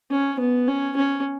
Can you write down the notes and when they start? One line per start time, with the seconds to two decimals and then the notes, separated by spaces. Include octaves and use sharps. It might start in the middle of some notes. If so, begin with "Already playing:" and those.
0.11 C#4
0.40 B3
0.68 C#4
0.96 C#4